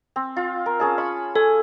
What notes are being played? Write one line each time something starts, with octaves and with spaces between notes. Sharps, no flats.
C4
F4
A#4
C#4 G#4 A5
B5 C#6
A4 G#5